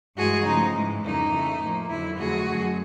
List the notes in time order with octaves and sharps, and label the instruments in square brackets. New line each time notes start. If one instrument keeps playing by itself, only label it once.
[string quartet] G2 E3 G#3 F#4 G#4
C#3 F3 A3 D#4
G#2 E3 G#3
F2 C#3 E3 G3 A#3 D#4
C#3 E3 A3
A2 F3 A#3
F2 D3 F#3 E4
F2 D3 F#3 A3 F#4 G#4
F#2 D3 F#3 A3